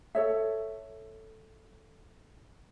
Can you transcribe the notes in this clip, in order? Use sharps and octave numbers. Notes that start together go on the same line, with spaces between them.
A4 C#5 E5